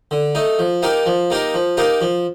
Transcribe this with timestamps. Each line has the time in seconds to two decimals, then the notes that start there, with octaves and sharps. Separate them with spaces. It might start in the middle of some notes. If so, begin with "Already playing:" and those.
0.11 D3
0.35 A3 D#4
0.59 F3
0.82 A#3 D#4 G4 A#4
1.06 F3
1.30 A#3 D#4 G4 A#4
1.54 F3
1.77 A#3 D#4 G4 A#4
2.01 F3